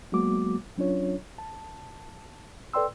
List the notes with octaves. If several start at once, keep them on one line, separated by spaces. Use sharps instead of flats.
F#3 G#3 A#3 B3 F#4 D6
F#3 C#4 D4 F4 C#5
A5
A4 B4 D5 G5 C6 E6